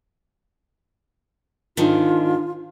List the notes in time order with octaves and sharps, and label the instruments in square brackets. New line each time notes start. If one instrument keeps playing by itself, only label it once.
[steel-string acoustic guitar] G#2 D3 D#3 [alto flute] F4